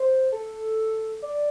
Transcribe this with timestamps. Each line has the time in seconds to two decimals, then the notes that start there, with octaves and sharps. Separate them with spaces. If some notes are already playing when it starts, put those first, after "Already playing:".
Already playing: C5
0.32 A4
1.22 D5